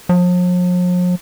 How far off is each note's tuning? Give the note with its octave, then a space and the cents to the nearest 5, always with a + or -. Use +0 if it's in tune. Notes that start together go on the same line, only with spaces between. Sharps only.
F3 +45